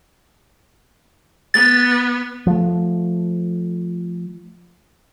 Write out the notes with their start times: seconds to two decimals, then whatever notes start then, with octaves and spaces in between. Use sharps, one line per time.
1.54 B3 A6
2.47 F3 A3